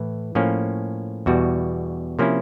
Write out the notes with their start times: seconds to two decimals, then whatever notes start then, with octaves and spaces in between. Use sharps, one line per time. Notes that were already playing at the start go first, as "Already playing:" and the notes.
Already playing: A2 E3
0.35 A2 F3 A#3 C#4
1.26 E2 B2 G3 F#4
2.19 C3 F3 A#3 C#4 E4